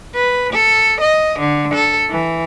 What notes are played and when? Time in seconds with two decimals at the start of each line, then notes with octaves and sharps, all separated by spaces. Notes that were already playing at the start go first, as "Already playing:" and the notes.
0.15 B4
0.53 A4
1.01 D#5
1.40 D3
1.75 A4
2.10 E3